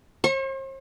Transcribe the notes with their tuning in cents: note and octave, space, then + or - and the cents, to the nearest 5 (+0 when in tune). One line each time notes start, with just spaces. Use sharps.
C5 +45 C#6 -30